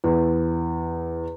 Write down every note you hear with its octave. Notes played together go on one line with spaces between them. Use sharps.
E2